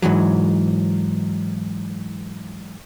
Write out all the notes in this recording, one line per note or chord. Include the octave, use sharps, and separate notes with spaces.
G#2 B2 E3 F#3